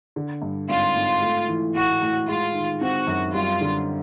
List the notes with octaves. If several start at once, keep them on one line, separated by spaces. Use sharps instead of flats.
D3
G2
G#1 F4
G#1
A3
E3
A2 F#4
A2
G#3 F4
D#3
C4 F#4
F#2
G3 F4
D3